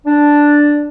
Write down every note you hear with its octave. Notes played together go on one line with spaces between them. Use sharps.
D4